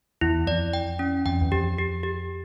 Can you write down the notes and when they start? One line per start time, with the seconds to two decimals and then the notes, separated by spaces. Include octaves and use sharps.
0.21 E2 E4
0.47 F2 D5
0.73 G5
0.99 C#4
1.26 F2 G5
1.41 E2
1.52 F2 G4
1.78 G4
2.03 G4